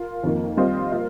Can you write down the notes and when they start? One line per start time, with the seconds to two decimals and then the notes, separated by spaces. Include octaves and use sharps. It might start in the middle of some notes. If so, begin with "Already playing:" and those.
Already playing: F4 A#4
0.23 F2 D#3 A#3
0.57 G3 C4 F4 C5 D#5
0.92 A#3 F4 A#4 F5